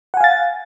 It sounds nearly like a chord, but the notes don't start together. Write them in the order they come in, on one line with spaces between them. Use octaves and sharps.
F#5 G#5 F5 A6